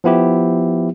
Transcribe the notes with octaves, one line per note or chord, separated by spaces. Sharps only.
F3 B3 E4 G4